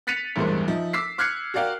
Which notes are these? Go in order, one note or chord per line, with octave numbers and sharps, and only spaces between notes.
F#6 A6 B6 C#7 D#7 F7
A1 E2 G2 G#3 A#4 C5
F3 D#4 E5
D6 E6 B6 C7
D6 F6 F#6 G#6 C7 C#7
F#4 A#4 D5 F5 G5